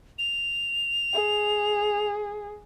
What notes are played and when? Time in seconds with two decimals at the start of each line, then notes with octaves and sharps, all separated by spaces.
0.19 F7
1.13 G#4